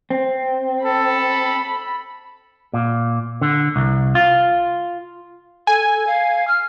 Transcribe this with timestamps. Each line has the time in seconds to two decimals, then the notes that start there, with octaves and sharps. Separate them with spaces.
0.10 C4
0.85 A4 B5
2.73 A#2
3.41 D3
3.76 C2
4.15 F4
5.67 A4 G#5
6.07 F5
6.48 F6